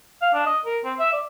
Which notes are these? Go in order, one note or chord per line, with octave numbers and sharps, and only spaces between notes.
F5
D4
D#5
A#4
C4
E5
D5